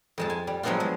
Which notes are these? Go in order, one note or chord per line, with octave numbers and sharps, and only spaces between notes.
F2 G#3 A5
G#5
G3
F3 F#3 G#3 B3 D4 F4
G#3